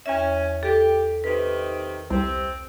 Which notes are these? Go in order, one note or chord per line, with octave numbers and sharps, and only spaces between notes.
E2 C#4 E5
G4 A4
C3 D#3 B4
C2 C3 C4